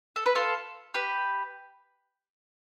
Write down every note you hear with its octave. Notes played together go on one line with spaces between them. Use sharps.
A4
B4
F4 A4
G4 B4